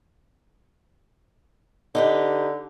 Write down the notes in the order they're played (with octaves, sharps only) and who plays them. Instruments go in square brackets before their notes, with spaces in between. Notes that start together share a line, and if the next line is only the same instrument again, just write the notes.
[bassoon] D3 [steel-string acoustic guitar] D#4 G4 B4